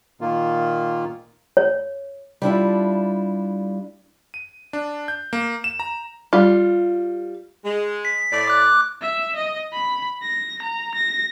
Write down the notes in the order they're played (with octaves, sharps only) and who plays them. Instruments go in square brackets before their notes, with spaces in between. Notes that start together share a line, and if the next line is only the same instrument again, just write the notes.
[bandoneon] A#2 D#3 A#3 F4
[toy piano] C#5
[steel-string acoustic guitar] G3 D4 E4 F4
[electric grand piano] D#7
D4
G6
A#3
E7
A#5
[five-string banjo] G3 F4
[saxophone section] G#3
[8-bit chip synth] B6
[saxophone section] A2 D5
[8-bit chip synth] D6 F#6
[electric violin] E5
D#5
B5
A#6
A#5
A#6